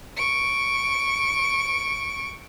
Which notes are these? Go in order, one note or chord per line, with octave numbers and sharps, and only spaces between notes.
C#6 D7